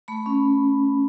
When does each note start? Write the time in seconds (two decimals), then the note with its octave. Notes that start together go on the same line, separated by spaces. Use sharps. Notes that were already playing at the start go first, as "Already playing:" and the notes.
0.08 A3 B5
0.26 C#4